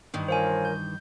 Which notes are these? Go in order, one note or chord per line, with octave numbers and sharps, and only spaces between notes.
G2 D#3 E3
F4 A#4 C5 C#5 F5 G#5
G6